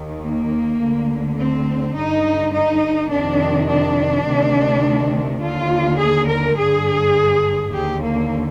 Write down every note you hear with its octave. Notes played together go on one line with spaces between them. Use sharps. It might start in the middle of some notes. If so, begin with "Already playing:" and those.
Already playing: D#2 D#3
A#3
D2 D3
C4
G2 D3 D#4
D#4
F2 C3 D#3 D4
D4
D2 C3 D#3
D#2 D3 F4
G#4
A#4
G2 D3 G#4
D#2 D3 G4
A#3